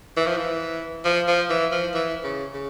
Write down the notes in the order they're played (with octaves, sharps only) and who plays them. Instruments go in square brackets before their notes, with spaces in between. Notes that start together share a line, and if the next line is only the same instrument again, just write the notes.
[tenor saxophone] E3
F3
E3
F3
F3
E3
F3
E3
C#3
C#3